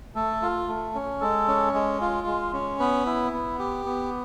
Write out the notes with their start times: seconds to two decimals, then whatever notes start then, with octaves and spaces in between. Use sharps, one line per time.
0.15 A3 A4
0.42 F4
0.68 A3
0.95 C#4
1.21 G#3 A4
1.48 C#4
1.74 G#3
2.01 F4
2.27 G#3
2.53 C#4
2.80 B3 B4
3.06 E4
3.33 B3
3.59 G4
3.86 B3